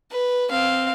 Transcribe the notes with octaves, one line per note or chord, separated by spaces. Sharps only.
B4
C4 F5